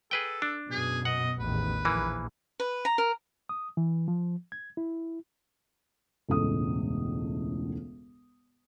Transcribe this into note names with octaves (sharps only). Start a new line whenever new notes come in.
G#4 A4 B4 G5
D4
F#2 B2 G#4
D#5 F#5
A1 E2 D#3 B4
A#1 E3 A#3
B4
A#5
A#4
D#6
E3
F3
G#6
E4
E1 C#2 A2 A4 D#6